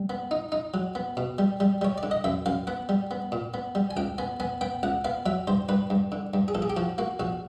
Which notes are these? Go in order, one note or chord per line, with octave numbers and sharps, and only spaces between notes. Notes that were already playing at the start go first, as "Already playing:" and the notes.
Already playing: G3
B3
D#4
D#4
F#3
B3
B2
G3
G3
G3 C#5
D5
D3
D#5
F#2 E5
F#2 F5
B3 F#5
G3
B3
A#2
B3
G3
G#5
C#2 G5
B3 G#5
B3 G#5
B3 G5
C#2 F#5
B3 F5
F#3 E5
G2 C5
G2 B4
G2
D3
G2
G#4
A#1 A4
G#4
G4
F3 F#4
A#3 F#4
A#1 F#4